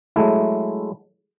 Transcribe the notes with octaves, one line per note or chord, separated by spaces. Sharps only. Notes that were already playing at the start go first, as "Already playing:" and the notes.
F#3 G#3 A3 E4